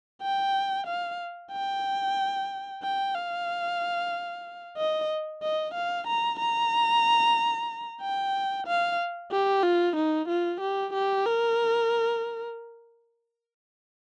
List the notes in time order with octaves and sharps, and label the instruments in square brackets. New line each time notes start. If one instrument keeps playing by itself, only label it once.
[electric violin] G5
F5
G5
G5
F5
D#5
D#5
F5
A#5
A#5
G5
F5
G4
F4
D#4
F4
G4
G4
A#4